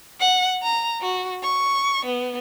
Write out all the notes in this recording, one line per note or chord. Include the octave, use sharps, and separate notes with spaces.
F#5
A#5
F#4
C#6
B3